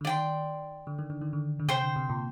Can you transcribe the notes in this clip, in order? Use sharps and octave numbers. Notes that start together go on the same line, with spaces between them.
D3
D#3 D5 G5 C6
D3
D#3
D3
D#3
D3
D3
C3 C5 G5 C6
D3
C3
A#2